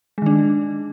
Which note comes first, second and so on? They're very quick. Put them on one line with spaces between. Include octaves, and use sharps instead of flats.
G#3 D#3 D4